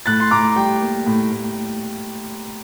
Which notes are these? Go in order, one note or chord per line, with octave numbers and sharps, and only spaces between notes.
A2 F#6 A6
C6
A2 A#5 D6
G3 G5
A#3
A2
A2